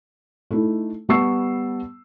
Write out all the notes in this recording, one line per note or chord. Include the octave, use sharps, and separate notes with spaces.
A3 D#4 E4
G3 B3 A5 C#6 E6 C7